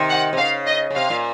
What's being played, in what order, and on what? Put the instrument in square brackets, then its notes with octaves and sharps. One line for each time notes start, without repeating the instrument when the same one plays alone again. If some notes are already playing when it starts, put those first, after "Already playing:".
Already playing: [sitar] C3 D#3
[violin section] F#5
[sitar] C3
[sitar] C#3 [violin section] F5
[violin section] D#5
[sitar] C#3
[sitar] C3 [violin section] F5
[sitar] A#2